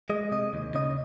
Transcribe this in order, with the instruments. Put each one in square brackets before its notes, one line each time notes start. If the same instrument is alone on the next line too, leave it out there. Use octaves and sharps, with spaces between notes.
[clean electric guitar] G#3 D#5
C3 D#5
D#2
C#3 D#5